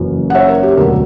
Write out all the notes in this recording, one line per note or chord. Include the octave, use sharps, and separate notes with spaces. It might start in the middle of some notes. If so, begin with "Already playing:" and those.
Already playing: F#1 F#2 E3
F#5
C#5 E5
A#4
G4
E1 D2 D3 F#3 B3 A#4